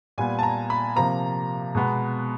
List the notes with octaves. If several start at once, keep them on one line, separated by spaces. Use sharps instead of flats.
A#2 G3 B3 G#5
A5
A#5
B5
C3 F3 A#3 A#5
B2 G#3 B3